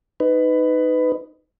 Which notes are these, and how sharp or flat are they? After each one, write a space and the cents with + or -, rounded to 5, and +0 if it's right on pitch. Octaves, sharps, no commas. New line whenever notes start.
D#4 +0 B4 +20